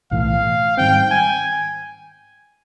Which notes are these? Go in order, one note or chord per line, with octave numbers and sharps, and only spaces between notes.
B1 A2 E3 A3 F5
G#2 D#3 G3 C4 G5
G#5